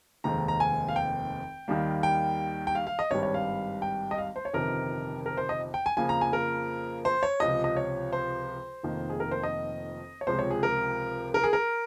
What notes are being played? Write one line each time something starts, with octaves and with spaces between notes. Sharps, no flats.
F1 D#2 D#3 G#3 C4 A#5
A#5
G#5
F5
G5
D#2 D#3 G3 A#3
G5
G5
F5
F5
D#5
G#1 G2 G3 C#5
C#5
F5
G5
D#5
F5
C5
C#5
G1 F2 C3 D#3 A#4
A#4
C5
D#5
G5
G#5
F2 C#3 F3 A#3 G#5
A#5
G#5
A#4
C5
C#5
C#2 C3 F3 D#5
D#5
C#5
C5
F1 F2 D#3 A#3
G#4
A#4
C5
D#5
C#5
C#2 C3 F3 G#3 C4 C5
C#5
G#4
A#4
A#4
G#4
A#4